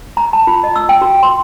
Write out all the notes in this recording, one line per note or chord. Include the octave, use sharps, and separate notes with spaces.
A#5
A5
F4
D#5
E6
G5
F#4
C6